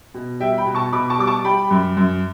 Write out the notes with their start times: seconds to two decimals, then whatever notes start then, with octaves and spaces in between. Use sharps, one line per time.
0.14 B2
0.40 G3 E5 G5
0.58 G5 B5
0.66 B2
0.75 A5 C#6
0.92 B2 B5 D6
1.10 A5 C#6
1.19 G3 D6
1.27 A5 C#6
1.44 G3 G5 B5
1.71 F#2
1.97 F#2